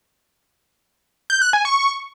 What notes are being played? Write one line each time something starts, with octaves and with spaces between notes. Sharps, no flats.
G6
F#6
G#5
C#6